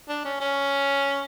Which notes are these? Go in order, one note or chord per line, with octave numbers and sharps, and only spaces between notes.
D4
C#4
C#4